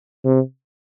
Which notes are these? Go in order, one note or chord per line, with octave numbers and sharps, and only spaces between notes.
C3